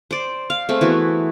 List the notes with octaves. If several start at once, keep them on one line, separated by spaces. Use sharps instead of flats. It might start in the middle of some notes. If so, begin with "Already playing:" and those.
C5 D5
F5
A3 C4 G#4
E3 B3 F#4